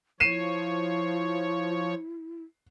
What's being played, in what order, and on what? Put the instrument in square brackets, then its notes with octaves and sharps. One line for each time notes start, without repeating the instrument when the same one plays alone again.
[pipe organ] F3 C#5 [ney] E4 [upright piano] C7 D#7 E7